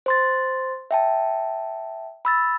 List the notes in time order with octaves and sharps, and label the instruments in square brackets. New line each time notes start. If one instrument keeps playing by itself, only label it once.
[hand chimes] C5 C6 A6
E5 G5 A5
B5 E6 A6